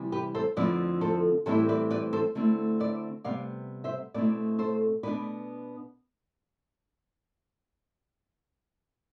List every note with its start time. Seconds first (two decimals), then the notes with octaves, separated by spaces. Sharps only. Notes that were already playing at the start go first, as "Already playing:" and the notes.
Already playing: C3 E3 G3 B3
0.12 G4 B4
0.35 A4 C5
0.57 F2 D3 F3 C4 E4 B4 D5
1.01 A4 C5
1.46 A2 E3 G3 C4 E4 A4 C5
1.69 B4 D5
1.91 B4 D5
2.13 A4 C5
2.35 D3 A3 C4 E4
2.80 B4 D5
3.24 C3 G3 B3 D5 F5
3.84 C5 E5
4.14 B2 A3 C4 E4 B4 D5
4.59 A4 C5
5.03 B2 B3 D4 B4 D5